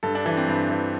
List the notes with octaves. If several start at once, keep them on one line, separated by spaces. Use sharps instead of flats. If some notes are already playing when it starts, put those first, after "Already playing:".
G2 A4
D4
E3 D4
C4
G2
E3